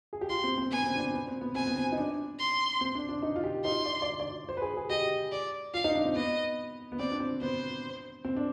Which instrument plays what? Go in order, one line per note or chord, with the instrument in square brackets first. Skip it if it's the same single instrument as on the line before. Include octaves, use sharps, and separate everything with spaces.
[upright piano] G#4
G4
[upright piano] F4 [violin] C6
[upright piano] C4
C4
[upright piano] B3 [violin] G#5
[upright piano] C4
D4
C4
B3
C4
B3
[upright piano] C4 [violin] G#5
[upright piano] B3
C4
D#4
D4
[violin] C6
[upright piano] C4
D4
D4
D#4
F4
G4
[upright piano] D#4 [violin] C6
[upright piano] D5
D5
D5
C5
B4
G#4
G#4
[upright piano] G4 [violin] D#5
[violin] D5
[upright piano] F4 [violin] F5
[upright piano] D#4
D4
C4
[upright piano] B3 [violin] D#5
[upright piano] B3
[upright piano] C4 [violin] D5
[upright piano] D4
C4
[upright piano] B3 [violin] C5
[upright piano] C4
D4